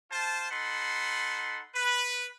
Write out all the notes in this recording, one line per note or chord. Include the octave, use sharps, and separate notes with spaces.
F4 C5 A5
D#4 A4 F#5 B5 C6
B4